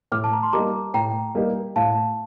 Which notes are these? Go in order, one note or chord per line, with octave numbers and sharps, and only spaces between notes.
A2 D6 F6
A5
A#5
C6
G3 A#3 D#4 G4 A#5 D6
A2 G5 A#5
G3 A#3 D#4 G4
A2 F5 A5